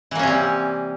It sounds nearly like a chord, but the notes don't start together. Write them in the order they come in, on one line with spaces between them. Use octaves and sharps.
E3 A#3 C#4 C3 G3